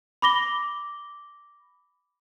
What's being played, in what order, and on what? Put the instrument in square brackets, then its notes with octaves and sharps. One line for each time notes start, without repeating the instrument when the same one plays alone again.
[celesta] B5 D6 A#6 G7